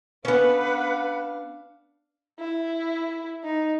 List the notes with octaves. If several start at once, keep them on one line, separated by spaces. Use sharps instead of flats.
B3 C#4 D4 B4 F5 F#5
E4
D#4